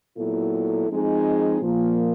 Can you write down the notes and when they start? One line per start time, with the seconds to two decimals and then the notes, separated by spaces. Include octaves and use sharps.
0.17 A#2 F#3 B3 E4 A4
0.88 F3 G#3 C4 D#4 G#4
1.61 A#2 F3 A#3